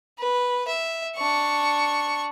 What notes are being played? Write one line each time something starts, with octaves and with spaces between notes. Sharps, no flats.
B4
E5
D4 C#6